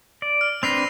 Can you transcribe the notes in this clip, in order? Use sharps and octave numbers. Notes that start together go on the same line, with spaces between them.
D5
F6
C4 D4 B4 A#6 C7 F7